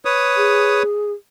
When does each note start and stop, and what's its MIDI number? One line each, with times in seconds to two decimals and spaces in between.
0.05 0.83 71
0.05 0.83 73
0.05 0.83 87
0.37 1.12 68